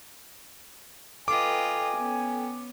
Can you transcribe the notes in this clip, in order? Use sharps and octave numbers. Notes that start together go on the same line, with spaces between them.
F4 A4 B4 D#5 G5 G#5 D6
B3 C#4